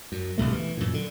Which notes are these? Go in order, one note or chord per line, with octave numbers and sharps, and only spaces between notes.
F#2
G1 C2 B2 A3
E3
F#2 A#2
D3